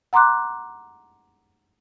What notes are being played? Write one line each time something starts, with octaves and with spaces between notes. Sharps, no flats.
F#5 A#5 C6 D6 F#6